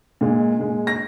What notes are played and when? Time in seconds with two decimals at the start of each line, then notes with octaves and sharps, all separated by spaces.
0.21 A#2 G#3
0.59 A#2 G#3
0.87 A#6